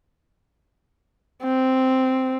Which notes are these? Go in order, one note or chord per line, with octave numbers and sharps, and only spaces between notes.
C4